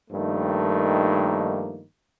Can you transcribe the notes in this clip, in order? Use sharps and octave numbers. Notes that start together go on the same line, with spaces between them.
G2 D#3 F3 A3 A#3 D#4